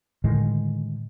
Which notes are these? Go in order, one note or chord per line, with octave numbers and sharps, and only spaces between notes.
A2 D3 D#3 G#3